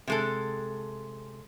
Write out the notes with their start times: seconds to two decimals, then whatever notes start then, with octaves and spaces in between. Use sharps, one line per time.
0.07 C3 G#3 A4